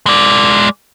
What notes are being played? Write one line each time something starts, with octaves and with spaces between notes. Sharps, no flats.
G#3 D5